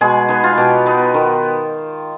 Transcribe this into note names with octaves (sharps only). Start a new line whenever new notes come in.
B2 G#3 G#4
B3 D#4
F4
B2 G4
B3 D#4
D#3